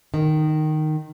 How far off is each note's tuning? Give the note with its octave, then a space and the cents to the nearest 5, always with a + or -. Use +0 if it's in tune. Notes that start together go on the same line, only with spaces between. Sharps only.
D#3 -10